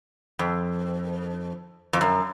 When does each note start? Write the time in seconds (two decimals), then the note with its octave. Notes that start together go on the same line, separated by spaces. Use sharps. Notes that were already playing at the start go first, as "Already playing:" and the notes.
0.39 F2
1.93 F2
2.01 F#2